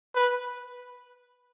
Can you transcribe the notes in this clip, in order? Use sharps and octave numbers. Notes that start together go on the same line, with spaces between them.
B4